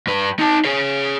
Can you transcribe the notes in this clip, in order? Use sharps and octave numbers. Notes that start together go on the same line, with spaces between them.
G2 B4
D#4 A5
G#4 C#5